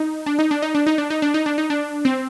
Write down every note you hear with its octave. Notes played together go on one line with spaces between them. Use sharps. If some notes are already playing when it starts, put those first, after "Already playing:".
Already playing: D#4
D4
D#4
D4
D#4
D4
D#4
D4
D#4
D4
D#4
D4
D#4
D4
C4